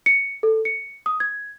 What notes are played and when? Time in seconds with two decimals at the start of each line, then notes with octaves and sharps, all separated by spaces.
0.06 C#7
0.43 A4
0.65 C#7
1.06 D#6
1.20 G#6